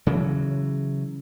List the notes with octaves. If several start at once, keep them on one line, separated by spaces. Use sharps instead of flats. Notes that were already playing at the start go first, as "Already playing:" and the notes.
C#3 E3 F#3